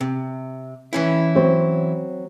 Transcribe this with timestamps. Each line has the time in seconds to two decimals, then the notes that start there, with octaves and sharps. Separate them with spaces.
0.01 C3
0.93 E3 C#4 E4
1.35 F#3 C4 C5